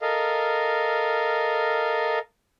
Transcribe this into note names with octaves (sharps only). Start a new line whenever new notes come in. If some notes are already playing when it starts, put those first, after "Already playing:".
A4 A#4 D#5 F5